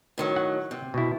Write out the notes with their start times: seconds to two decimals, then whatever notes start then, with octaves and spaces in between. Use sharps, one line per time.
0.18 A2 D#3 F#3
0.36 F#5
0.71 C3
0.94 B2 E4